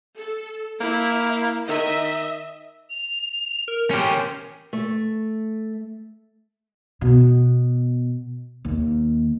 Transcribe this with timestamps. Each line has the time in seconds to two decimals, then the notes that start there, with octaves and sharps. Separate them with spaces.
0.16 A4
0.80 A#3 E4
1.69 D#3 D#5 E5
2.90 F7
3.68 A#4
3.91 C#4 G4 C6
4.73 A3
7.01 B2
8.65 D#2